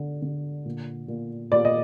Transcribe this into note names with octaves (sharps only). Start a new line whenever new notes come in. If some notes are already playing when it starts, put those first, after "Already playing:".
Already playing: D3
D3
A#2
A#2
A#2 D5
D#5